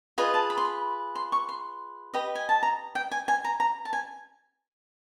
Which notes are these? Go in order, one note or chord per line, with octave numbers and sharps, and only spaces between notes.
F4 G#4 B4 D#5
A5
B5
C6
B5
C6
C#6
C6
G4 B4 D#5
G#5
A5
A#5
G5
G#5
G#5
A#5
A#5
A5
G#5